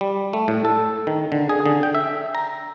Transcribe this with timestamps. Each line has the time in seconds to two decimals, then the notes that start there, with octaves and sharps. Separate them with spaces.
0.01 G3
0.33 A3
0.48 A2
0.65 A4
1.07 D#3
1.32 D3
1.49 G#4
1.66 D3
1.83 G5
1.95 E5
2.35 A#5